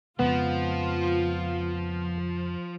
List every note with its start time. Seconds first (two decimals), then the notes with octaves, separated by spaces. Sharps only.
0.19 F2 C#3 F3 G#3 B3 F4